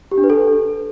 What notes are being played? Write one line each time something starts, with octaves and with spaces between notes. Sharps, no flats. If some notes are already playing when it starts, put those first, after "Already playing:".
G4
D4
B4
A4